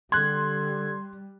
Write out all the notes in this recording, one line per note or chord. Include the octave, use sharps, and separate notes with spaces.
D3 G3 C6 F#6 G#6